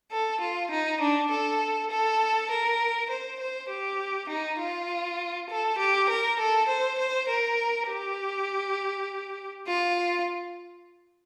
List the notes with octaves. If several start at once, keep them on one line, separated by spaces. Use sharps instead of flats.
A4
F4
D#4
D4
A4
A4
A#4
C5
C5
G4
D#4
F4
A4
G4
A#4
A4
C5
C5
A#4
G4
F4